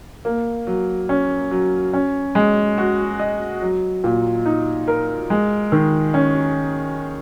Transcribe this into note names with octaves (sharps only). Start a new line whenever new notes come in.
A#3
F#3
C#4
F#3
C#4
G#3
F#4
D#5
F#3
A#2
D#4
A#4
G#3
D#3
C#4